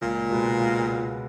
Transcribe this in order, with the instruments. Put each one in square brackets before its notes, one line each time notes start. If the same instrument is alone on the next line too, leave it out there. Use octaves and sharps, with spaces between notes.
[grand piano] C#2 [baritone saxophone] A#2
[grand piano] B2 G#3 B3
C#2